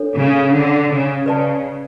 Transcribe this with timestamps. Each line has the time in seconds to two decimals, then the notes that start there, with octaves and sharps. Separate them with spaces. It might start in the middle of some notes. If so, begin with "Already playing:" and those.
Already playing: D4 A4 C#5
0.17 C#3
0.54 D3
0.90 C#3
1.26 C#3 B4 D5 A5